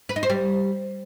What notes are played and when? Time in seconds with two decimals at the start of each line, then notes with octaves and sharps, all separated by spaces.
0.09 B4
0.16 D#4
0.23 C5
0.29 G3